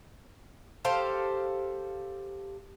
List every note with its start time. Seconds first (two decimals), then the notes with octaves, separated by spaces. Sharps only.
0.85 G4 A4 C5 F5